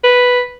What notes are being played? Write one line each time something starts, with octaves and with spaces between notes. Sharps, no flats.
B4